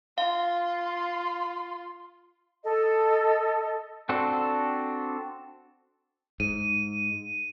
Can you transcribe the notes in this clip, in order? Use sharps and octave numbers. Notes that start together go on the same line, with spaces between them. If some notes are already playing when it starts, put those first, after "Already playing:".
F4 F5 C6
A4 D#5
C4 D4 F#4 A4
G#2 D#7